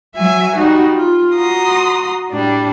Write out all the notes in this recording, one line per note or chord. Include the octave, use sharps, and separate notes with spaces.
F#3 E5 G#5
G3 D#4 F#4
F4
F#4 A#5 C6 D#6
A2 G3 D4